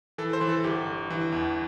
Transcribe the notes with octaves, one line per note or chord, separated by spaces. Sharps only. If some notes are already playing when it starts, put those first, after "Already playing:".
E3 A4
C5
E3
A4
G1 G4
G1
E3
E2